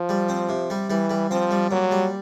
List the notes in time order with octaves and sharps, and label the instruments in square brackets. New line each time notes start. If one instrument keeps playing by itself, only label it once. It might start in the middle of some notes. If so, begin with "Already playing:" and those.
Already playing: [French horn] F3
[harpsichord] G3
C4
C3
G3
[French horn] E3 [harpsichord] G3
[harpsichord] G3
[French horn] F3 [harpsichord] C4
[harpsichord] G3
[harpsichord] A#2 [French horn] F#3
[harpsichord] G3